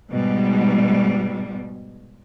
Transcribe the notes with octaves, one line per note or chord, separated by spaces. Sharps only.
G#2 B2 G3